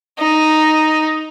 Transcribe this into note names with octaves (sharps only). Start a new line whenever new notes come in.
D#4